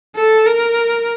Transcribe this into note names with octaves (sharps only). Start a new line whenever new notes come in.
A4
A#4